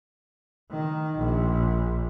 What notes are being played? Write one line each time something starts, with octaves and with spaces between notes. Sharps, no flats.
D#3
A#1